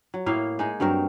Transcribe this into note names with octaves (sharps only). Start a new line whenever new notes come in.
F#3
A2 A#3 E4 F5
G#3 D#4 G#4
G2 F#3 C4 A#4